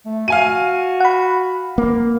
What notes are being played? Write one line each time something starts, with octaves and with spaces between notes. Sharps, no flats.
A3
F#4 F5 G#5 D#7
F#5 B5
A#3